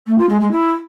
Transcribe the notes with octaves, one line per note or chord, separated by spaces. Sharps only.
A3
F4
G#3
G#3
E4